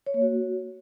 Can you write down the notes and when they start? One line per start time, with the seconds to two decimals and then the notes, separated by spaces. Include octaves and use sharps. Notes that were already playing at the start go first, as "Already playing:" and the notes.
0.06 C#5
0.14 A#3
0.22 F#4